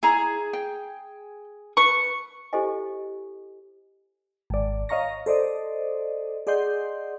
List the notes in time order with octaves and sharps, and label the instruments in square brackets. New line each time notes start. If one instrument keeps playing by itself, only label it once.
[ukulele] E4 A#5 [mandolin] G#4
[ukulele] G5
[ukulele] B4 [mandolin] C#6
[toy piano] E4 G4 A4 C5 D#5 G#5
[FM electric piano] G#1 D5
C#5 D#5 F5 A#5 C#6 A#6
A4 C5 D5 D#5
G#4 D5 D#5 F#5 C6 G6